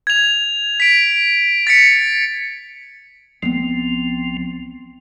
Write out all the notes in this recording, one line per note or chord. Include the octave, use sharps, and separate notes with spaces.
G#6 F7
B6 D7
A6 B6 C#7
C2 F3 B3 C4